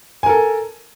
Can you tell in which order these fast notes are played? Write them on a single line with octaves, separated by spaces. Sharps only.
G#5 A#4 A4